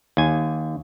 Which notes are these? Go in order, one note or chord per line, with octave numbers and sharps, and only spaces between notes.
D#2 G#5